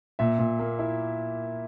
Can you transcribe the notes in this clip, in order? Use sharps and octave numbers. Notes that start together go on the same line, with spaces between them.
A#2 E5
A#2
A#3
E4